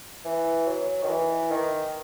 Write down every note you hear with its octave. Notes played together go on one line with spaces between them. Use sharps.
E3
F#3
D#3
E3
D#3